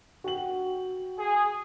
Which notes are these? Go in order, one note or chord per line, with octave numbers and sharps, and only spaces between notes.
F#4 G5 F#7
G#4